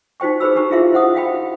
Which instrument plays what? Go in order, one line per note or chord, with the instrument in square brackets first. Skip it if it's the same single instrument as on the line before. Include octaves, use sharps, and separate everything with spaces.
[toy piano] D#4 F#4 C5 G5 C#6
G#4 B4 C5 B5 E6
D4 G4 A#5 C#6
E4 F4 G#4 E5 F5 C6
E4 C5 F#5 D#6
F#4 F5 G5 B5